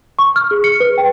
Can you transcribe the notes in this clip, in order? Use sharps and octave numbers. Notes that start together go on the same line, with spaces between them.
C#6
F6
G#4
C#7
B4
G5